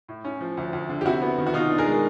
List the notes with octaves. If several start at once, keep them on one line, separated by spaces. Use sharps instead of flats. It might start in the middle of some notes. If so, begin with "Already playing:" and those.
A2
C#4
F3
D2
D2
D3
G4
C3 E4 F#4
B3
D#3
F#4
B2 D#4 F4
D4
G#4 A#4
G#3